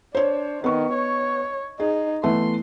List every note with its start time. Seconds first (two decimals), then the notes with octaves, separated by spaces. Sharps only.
0.15 D4 C5 C#5
0.64 D#3 B3 C#6
0.93 C#5
1.80 D#4 G#4
2.23 E3 A3 B3 C6